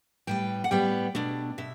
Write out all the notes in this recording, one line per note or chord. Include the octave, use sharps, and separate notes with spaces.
A2 G3 B3 G5
F#5
A2 G3 B3 G5
B2 A3 D4
B2 E5